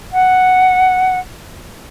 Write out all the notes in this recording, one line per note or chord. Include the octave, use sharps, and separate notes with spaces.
F#5